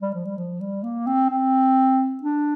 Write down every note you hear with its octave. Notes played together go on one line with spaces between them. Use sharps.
G3
F3
G3
F3
G3
A#3
C4
C4
D4